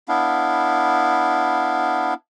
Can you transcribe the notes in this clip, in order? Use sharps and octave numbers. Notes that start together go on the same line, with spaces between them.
B3 D4 E4 F5